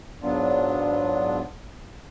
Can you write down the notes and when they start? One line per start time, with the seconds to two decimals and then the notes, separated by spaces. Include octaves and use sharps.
0.22 G#2 F#3 B3 D4 F4